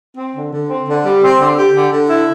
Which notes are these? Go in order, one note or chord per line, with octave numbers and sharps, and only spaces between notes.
C4
D3
D3
C4
D3
G3
C4
D3
G4
D3
D3
E4